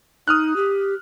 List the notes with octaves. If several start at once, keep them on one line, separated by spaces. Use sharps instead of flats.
D#4 D#6 F6 F#6
G4